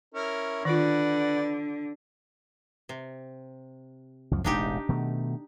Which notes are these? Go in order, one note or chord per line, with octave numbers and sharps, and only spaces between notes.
C#4 E4 A#4
D3 D#3 F4 B4 D5 F#5
C3
C#2 F#2 F3
E1 A1 G#3 D4 D#4 G4
B2 D#3 A3